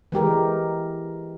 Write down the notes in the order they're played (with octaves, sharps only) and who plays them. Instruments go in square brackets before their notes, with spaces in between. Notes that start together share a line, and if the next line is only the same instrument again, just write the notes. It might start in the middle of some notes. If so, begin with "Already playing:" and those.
[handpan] E3 G#3 G4 A#4